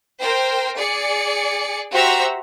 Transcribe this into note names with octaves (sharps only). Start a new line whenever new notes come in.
A#4 C5 G5
G#4 D5 C#7
F#4 G4 C5 E5 A#5 E6